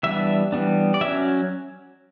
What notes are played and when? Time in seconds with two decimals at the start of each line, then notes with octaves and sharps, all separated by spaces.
0.03 E3 G3 B3 D4 E5
0.52 E3 G3 B3 D4
0.94 D5
1.01 F#3 C#4 E5